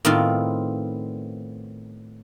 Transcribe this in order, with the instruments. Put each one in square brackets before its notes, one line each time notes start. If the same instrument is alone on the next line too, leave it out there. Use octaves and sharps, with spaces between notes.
[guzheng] A2 D#3 B3 C4 F4